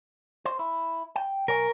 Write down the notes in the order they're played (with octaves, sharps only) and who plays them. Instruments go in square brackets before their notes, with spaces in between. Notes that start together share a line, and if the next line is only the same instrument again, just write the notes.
[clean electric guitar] C5
E4
G5
[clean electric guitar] B1 C#5 G#5 [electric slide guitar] A#4